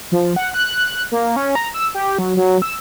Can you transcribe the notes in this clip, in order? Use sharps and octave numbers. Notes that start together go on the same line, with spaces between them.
F3
F#5
F#6
A#3
C#4
A#5
E6
G4
F#3
F#3
E6